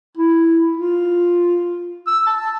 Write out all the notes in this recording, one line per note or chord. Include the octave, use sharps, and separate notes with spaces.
E4
F4
E6
A5